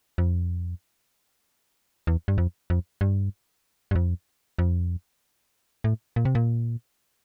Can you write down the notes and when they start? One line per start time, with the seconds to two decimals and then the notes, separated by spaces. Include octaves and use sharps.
0.18 F2
2.07 E2
2.28 G2
2.38 F2
2.70 F2
3.01 G2
3.91 G2
3.95 F2
4.59 F2
5.84 A2
6.16 A#2
6.25 C3
6.35 A#2